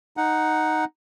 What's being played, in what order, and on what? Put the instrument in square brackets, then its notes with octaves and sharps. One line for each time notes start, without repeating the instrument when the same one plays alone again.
[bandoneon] D#4 F#5